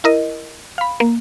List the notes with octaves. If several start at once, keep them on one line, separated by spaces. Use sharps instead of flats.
E4 A#4 D#5
F5 B5
A#3